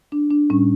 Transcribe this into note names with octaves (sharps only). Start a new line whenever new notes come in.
D4
D4
A2 G3 C#4